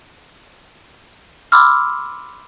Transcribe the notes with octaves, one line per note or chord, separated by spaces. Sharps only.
B5 C6 D6 E6 F6